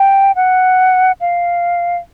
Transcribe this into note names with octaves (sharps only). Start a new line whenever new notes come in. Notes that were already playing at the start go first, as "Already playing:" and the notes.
Already playing: G5
F#5
F5